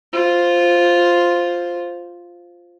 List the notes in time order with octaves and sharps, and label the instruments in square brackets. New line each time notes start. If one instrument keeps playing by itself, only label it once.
[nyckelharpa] F4 C5